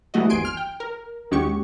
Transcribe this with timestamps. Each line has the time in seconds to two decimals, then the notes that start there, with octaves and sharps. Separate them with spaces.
0.14 E3 F#3 G3 A3 F#4 D#5
0.30 G#1 E2 G#5 C6 D7
0.45 F6
0.57 G5
0.80 A#4
1.31 D#2 G#3 C#4 F#4 G4 C#6